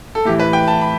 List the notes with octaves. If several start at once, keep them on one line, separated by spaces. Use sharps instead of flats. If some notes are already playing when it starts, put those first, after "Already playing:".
A4
A2 E3 G4
B4
G5
A5
B5